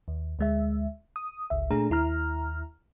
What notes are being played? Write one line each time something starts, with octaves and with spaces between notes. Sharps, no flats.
D#2
D2 G#3 E5
D#6
G1 C#2 E5
A#2 A3 D4 G#4 A#5
D#2 E4 A#5 F6